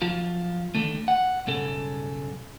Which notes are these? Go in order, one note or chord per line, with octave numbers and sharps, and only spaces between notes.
F#2 F3 F4
D3 D#3 A3
F#5
B1 G2 C#3 A4